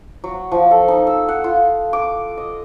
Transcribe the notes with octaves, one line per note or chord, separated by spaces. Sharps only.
F#3
F3
A4
D#4
E6
F#5
F4
D6
D#5